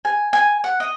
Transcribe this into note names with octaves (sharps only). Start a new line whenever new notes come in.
G#5
G#5
F#5
D#5